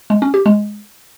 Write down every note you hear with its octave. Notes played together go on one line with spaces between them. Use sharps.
G#3
C#4
G4
G#3